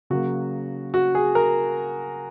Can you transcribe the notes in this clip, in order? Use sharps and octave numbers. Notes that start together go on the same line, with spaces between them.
C#3 F#3 A#3 F#4
F#4
G#4
A#4